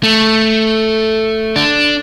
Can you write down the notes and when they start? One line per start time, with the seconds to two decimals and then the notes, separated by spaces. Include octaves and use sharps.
0.03 A3
1.56 D4